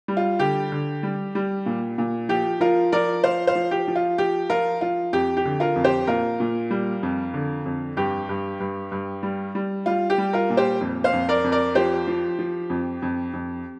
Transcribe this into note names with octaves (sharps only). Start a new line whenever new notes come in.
G3
F4
D3 G4
D3
G3
G3
A#2
A#2
F3 G4
F3 F4 A#4
F3 A#4 D5
F3 C5 F5
C5 F5
F3
G4
F3
F4
F3 G4
F3 F4 A#4
F3 F4
F2 G4
G4
D3
F4 A#4
F2
G4 C5
A#2 F4 A#4
A#2
G3
F2
D3
F2
G2 G4
G2
G2
G2
G3
G3
G3 F4
G4
G3
F4 A#4
A#2
G4 C5
F2
C5 F5
F2
A#4 D5
F2
A#4 D5
F3 G4 C5
F3
F3
F2
F2
F2